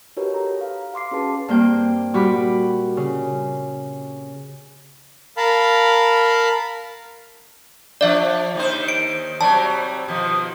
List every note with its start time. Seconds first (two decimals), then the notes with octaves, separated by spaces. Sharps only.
0.17 D#4 F#4 G4 A#4 B4 C#5
0.34 A4 A#5
0.61 F5
0.94 F5 C6 D6 C7
1.11 C#4 F#4 G#4 B4 A5
1.48 G2 A#3 C4 G5
2.13 A#2 G3 F#4 G4 B5 D6
2.97 C#3
5.37 A#4 F5 A5 B5
8.01 F3 D4 D5 E5
8.55 D#2 D#3 C5
8.88 D7
9.41 C3 F#3 G3 A5
10.08 B2 D#3 F3